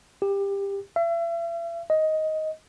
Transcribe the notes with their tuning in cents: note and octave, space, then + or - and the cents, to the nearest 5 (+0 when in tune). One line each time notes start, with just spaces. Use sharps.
G4 +20
E5 +40
D#5 +10